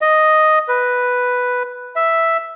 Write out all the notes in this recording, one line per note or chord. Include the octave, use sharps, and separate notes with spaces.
D#5
B4
E5